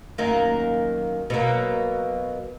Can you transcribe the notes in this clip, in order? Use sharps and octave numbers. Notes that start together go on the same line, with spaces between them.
F#2 D#3 A#3
B2 F#3 A#3